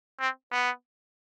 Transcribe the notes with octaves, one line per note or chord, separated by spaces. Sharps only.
C4
B3